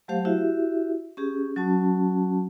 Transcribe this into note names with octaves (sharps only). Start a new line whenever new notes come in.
F#3 A3 G4 C5 F5
E4 F#4 G4 E5
C#4 G4 G#4
F#3 C#4 F#4 A5